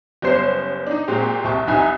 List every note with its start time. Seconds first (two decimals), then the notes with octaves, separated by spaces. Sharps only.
0.22 F#1 G3 B3 C#4 C5 C7
0.86 D4 D#4
1.08 A#2 G#3 C4 F#4 G4
1.44 C2 A5 C#6
1.67 C2 E3 D#4 E5 G#5 B5